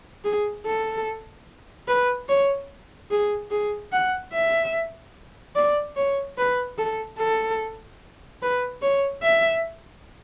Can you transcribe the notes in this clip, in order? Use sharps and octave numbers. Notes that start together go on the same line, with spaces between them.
G#4
A4
B4
C#5
G#4
G#4
F#5
E5
D5
C#5
B4
A4
A4
B4
C#5
E5